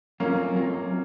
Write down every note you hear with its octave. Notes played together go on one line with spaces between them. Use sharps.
F#3 A3 A#3 C4 C#4 F4 A#4
F#3 A3 C4 F4 A#4